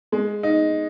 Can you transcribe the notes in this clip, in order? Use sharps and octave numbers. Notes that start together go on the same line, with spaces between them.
G#3
D#4